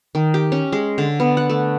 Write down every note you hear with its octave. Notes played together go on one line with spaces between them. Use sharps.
D#3
G4
C#4
G#3
D3
B3
F#5
A3